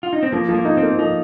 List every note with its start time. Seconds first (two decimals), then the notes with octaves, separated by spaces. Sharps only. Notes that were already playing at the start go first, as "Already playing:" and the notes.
0.03 F4
0.13 D#4
0.23 C4
0.32 F3 A#3
0.49 F3
0.54 A#3
0.65 D#4
0.77 C4
0.82 A#3
0.99 F3 D#4